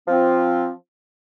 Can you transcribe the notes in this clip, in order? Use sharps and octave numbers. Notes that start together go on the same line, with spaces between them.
F3 C4 F4